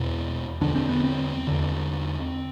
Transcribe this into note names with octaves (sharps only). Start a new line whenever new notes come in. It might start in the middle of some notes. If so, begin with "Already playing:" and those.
Already playing: E2 B2 C4
E2 D3 D4
C4
B3
C4
E2 D3